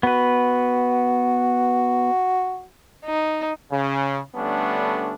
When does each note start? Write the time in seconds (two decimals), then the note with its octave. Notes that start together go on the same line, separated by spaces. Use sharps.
0.03 B3 F#4 B4
3.05 D#4
3.71 C#3
4.35 D3 G3 A3 B3 C#4 D4